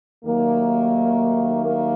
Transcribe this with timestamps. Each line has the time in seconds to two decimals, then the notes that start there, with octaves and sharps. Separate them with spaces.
0.24 D#2 D#3 F#3 A3 A#3
1.64 A#3